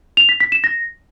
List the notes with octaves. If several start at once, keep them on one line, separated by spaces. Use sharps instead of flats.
F7
B6
B6
E7
A#6